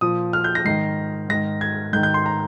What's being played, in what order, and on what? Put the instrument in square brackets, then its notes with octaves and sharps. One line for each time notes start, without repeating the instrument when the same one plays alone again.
[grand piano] A#2 F3 D#6
F6
G6
A#6
G#2 D#3 C7
G#2 D#3 A#6
G#6
G#2 G6
D#3
G6
C6
A#5